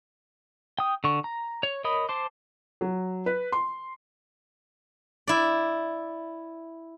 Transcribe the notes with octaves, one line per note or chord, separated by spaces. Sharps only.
G5 D#6
D3 C#6
A#5
C#5
A#4 C#5 D#5 B5 D#6
C5 A5 C6 D6
F#3
B4
C6
E4 D5